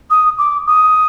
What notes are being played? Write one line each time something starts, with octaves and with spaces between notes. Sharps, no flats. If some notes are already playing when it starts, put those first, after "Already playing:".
D#6
D6
D#6